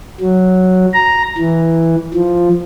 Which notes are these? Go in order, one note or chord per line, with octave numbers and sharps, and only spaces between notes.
F#3
A#5
E3
F3